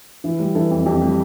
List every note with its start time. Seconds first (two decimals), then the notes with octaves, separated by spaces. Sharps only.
0.24 E3
0.39 G3
0.55 E3 A4
0.71 F2
0.86 F2 G4
1.02 G3